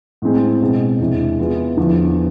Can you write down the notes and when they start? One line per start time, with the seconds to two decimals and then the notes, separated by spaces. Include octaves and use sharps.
0.22 A2 G#3 C4 G#4
0.61 B2 G#3 C4 G#4
0.99 E2 C3 E3 G#3 D4
1.39 E3 B3 F4 G#4
1.77 E2 D3 F3